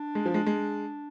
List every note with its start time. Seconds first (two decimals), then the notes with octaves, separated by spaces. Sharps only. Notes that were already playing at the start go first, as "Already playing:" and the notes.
Already playing: D4
0.15 G#3
0.26 F3
0.34 G#3
0.46 G#3